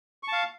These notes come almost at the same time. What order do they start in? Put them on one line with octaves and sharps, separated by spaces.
C#6 A5 F5